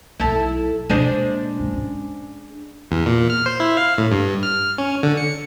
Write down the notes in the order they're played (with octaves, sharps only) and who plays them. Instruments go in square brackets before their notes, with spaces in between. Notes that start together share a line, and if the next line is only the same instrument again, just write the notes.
[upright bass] B1 F#3 [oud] E4 A4
[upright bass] B2 A#3 [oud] G#3 D4 C5
[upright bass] G#1 F3
C#4
[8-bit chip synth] E2
A#2
F6
C5
E4
F5
A2
G2
F6
C#4
D3
C#7